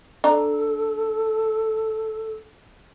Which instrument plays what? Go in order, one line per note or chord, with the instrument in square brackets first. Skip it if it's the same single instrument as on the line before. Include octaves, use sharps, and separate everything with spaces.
[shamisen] D4 A#5 [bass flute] A4